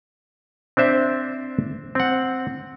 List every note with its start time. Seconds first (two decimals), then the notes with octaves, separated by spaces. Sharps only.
0.77 C4 D4 C5 E5
1.95 C4 F#5